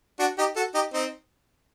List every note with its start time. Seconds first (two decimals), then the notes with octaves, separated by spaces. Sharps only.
0.19 D4 F#4
0.38 D#4 G4
0.56 F#4 A4
0.74 D#4 G4
0.93 C4 D#4